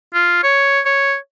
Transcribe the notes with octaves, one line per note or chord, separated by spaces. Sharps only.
F4
C#5
C#5